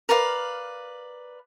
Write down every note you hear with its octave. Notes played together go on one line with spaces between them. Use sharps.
A#4 B4 D5 F5